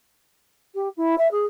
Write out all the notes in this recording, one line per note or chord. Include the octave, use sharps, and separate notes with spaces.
G4
E4
E5
G#4